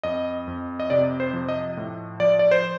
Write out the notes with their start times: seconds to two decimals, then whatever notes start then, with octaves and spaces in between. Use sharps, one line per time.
0.04 F2 D#5
0.48 F2
0.80 D#5
0.90 C3 D5
1.20 C5
1.33 F3
1.49 D#5
1.77 A2
2.20 F3 D5
2.39 D5
2.51 C5